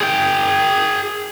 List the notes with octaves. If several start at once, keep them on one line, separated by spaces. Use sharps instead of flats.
G#4 G5